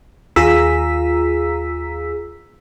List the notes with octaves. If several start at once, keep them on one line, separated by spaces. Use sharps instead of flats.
D#2 F4 G#4 A#5 E6 B6